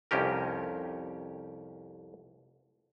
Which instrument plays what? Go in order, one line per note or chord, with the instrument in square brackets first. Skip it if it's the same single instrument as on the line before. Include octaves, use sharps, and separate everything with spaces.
[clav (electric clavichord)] C2 F2 C#4 G4 A#4